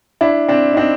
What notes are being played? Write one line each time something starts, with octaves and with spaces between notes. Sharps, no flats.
D4 E4
C4 D4
D#4
C4 D4